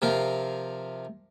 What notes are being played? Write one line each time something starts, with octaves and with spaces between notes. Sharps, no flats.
C3 F3 F4 A#4